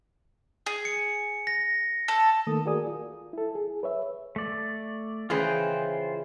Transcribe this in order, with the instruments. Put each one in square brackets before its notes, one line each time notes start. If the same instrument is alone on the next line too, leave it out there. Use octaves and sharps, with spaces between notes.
[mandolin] G#4
[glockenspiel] C#7
A#6
[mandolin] A4
[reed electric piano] D#3 A3 A#3 A4 D#6
F#4 G#4 A#4 D5 G#5 D#6
F4
E4 A4
G#4
B4 C#5 E5
[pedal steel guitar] A3 D5
[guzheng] C#3 E3 D#5 [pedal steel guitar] F4 C5 G5